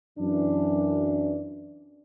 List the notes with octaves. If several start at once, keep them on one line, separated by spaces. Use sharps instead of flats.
F#2 E3 D4